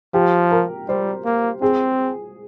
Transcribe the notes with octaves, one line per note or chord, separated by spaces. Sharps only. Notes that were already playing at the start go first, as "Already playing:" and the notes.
F3 G4
A#4
G3 C5
A#3
C4 G#4